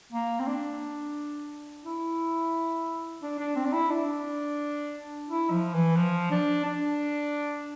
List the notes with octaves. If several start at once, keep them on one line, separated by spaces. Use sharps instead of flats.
A#3
C4
D4
E4
D4
D4
C4
D4
E4
D4
E4
F3
E3
F3
D4
D4